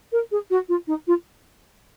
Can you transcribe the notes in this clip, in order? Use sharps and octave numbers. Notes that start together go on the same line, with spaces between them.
A#4
G#4
F#4
F4
D#4
F4